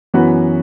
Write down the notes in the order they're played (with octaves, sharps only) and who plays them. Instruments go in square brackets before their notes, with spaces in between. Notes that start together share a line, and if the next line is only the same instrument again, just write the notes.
[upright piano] F#2 E3 B3 F#4 B4